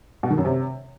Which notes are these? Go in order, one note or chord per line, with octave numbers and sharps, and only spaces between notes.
B2
D#3
F#2
C3